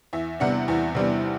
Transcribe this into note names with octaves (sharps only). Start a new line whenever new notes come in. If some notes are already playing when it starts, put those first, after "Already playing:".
E2 E5
C3 G3 B3 D4 F#5
E2
C3 G3 B3 D4